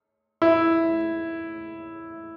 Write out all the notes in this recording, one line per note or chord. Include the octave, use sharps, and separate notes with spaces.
E4